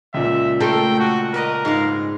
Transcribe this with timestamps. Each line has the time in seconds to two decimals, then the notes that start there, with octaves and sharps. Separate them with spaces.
0.14 C#2 A#2 E5
0.60 A3 A4 A#4 C5 G5
0.99 F#4
1.34 A#4 B4 D5 D#5
1.65 G#2 F5